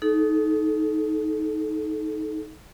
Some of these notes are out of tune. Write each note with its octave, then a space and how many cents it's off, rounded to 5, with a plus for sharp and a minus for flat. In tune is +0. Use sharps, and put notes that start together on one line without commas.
D#4 +10 A4 -30